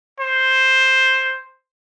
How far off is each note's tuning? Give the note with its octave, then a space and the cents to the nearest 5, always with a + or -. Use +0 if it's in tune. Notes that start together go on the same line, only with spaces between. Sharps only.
C5 +5